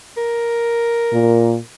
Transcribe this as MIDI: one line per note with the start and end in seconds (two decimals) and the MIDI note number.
0.17 1.63 70
1.13 1.57 46